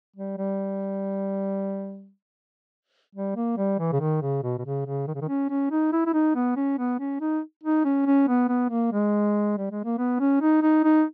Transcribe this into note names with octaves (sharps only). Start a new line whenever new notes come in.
G3
G3
G3
A#3
G3
E3
C#3
D#3
C#3
B2
B2
C#3
C#3
D#3
C#3
D#3
C#4
C#4
D#4
E4
E4
D#4
B3
C#4
B3
C#4
D#4
D#4
C#4
C#4
B3
B3
A#3
G#3
G3
G#3
A#3
B3
C#4
D#4
D#4
D#4